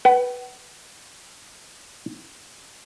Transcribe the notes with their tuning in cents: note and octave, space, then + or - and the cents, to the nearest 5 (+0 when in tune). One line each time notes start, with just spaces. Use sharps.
B4 +0 F#5 +40